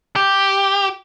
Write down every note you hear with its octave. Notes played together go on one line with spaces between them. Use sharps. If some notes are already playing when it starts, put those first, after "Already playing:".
G4